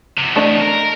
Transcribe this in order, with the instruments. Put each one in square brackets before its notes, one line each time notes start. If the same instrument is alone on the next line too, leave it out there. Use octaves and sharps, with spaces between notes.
[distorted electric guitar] E2 C3
[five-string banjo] A3 D4 D#5
[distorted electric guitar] A#4